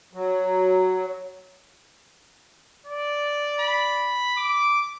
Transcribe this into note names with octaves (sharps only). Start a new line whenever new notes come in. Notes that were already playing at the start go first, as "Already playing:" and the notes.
F#3
D5
B5
D6